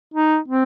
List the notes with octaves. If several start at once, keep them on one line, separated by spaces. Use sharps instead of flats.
D#4
C4